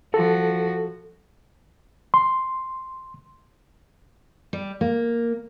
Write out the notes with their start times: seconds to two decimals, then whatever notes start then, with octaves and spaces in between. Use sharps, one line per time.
0.14 F3 F#4 A4
2.14 C6
4.53 G3
4.81 A#3